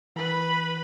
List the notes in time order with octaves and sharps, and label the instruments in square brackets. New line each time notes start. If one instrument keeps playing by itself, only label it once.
[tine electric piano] E3 B6 [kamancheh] B4 B5